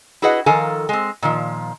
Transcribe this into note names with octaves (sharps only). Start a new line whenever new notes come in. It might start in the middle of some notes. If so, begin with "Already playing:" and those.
E4 F#4 G#4 B4 D#5 F#5
D#3 F3 A4 A#4 F5 G#5
G#3 C4
A#2 D#3 F3